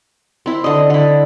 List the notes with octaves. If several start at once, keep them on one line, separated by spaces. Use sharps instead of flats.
C4 E4
D3 D#5
D3 E4